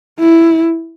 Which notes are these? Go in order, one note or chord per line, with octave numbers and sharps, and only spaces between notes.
E4